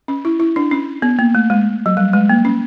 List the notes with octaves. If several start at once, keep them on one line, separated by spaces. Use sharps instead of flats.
C#4
E4
E4
D4
C#4
B3
A#3
A3
G#3
F#3
G3
G#3
A#3
C#4